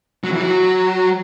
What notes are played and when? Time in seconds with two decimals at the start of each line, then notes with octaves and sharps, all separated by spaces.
0.24 F#3
0.32 E3
0.40 F#3